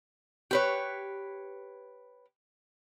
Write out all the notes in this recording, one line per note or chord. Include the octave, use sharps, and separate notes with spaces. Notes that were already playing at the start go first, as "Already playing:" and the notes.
G4 B4 C#5